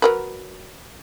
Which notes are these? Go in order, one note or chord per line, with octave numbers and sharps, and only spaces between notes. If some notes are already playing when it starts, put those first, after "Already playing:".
F#3 A#4 B4